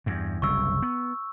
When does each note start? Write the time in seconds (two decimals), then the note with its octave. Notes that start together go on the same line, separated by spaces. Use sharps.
0.06 E2 G2
0.42 F#1 C2 C#3 C#6 E6
0.82 B3